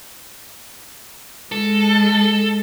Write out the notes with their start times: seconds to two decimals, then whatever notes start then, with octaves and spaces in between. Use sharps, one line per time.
1.52 G#3 A4